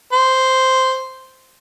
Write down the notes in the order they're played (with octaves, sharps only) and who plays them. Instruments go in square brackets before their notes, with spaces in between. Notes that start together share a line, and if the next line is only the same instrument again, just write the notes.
[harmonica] C5